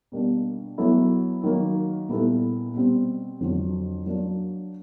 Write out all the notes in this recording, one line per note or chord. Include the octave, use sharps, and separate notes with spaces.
B2 G3 A#3 D4
F#3 B3 E4 A4
D#3 F#3 A#3
A#2 G3 B3 E4 A4
B2 G3 C4
F2 D3 F#3
F#3 A#3 D4